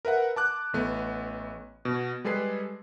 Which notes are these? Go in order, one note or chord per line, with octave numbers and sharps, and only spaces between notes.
A#4 B4 E5 F#5
A5 D6 F#6
A1 A3 B3
B2
G3 G#3 G#4 A4 B4 C7